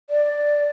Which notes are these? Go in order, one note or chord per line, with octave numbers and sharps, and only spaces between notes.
D5